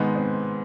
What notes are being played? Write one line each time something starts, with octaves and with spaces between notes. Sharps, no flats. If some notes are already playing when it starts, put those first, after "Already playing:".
Already playing: G#2 D#3 G#3 B3
C4